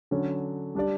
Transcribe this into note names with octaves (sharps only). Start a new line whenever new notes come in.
D3 F#3 C#4
G3 D4 G4 D5